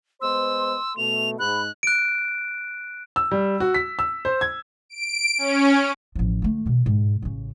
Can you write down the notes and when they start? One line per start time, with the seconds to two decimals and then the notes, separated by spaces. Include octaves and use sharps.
0.21 G#3 B3 C5 C6 E6
0.97 B2 A3 F7
1.39 G#2 B5 F#6
1.83 F#6 D7
3.16 E6
3.32 G3
3.60 F#4
3.74 B6
3.99 E6
4.25 C5
4.41 G#6
4.89 D7
5.38 C#4
6.15 A1 F3
6.42 D3 A3
6.66 B2 D#3
6.86 G#2
7.22 A1 C#3